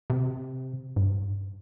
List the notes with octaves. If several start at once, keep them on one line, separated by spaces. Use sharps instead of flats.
C3
G#2
G2